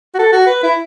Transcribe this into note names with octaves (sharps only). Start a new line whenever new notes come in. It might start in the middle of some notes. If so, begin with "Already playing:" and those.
F#4
A4
F#4
B4
E4